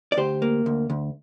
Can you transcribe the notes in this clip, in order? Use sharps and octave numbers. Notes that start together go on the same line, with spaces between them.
D5
D2 G4 C5
A#3
D2
D2